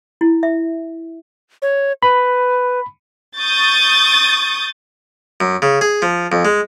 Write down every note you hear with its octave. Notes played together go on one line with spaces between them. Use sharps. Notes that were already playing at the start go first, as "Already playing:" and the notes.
E4
E5
C#5
B4 B5
C#6 D#6 G6 A6
F#2
C#3
G#4
F3
F2
G#3